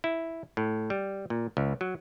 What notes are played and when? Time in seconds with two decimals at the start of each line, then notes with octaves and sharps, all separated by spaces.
0.04 E4
0.57 A2
0.90 G3
1.30 A#2
1.57 C#2
1.81 F#3